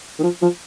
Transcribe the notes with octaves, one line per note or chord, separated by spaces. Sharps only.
D#3
F3
F3